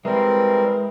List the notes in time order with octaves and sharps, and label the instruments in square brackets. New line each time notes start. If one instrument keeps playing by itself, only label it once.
[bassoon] E3 [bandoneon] G3 C4 A#4 [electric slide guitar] G#3